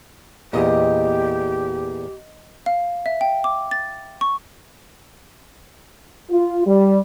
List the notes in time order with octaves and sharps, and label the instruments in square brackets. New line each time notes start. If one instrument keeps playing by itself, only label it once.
[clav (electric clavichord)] E2 A#2 [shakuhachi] G4 [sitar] D#5
[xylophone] F5
E5
G5
D6
A6
C#6
[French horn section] F4
G3